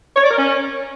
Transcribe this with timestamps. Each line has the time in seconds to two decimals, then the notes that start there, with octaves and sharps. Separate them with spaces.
0.16 C#5
0.24 D5
0.31 A#4
0.38 C#4